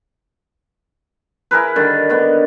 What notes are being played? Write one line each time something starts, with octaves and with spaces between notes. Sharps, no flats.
E4 G#4 A#4 B4
D3 D#3 G3
D3 D#3 B3